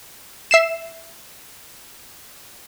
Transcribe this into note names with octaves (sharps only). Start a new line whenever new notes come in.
E5 C7 E7